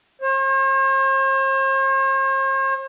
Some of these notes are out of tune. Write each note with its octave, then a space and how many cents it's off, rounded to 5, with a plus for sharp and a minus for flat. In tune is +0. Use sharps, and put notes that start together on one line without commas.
C5 +45